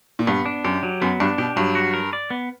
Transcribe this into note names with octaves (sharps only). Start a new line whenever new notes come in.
A#2
G2 B3
D4
F#2 G4
F#3
F#2 B3
G2 D4
B2 G4
G2 F#3
F#4
A#4
D5
B3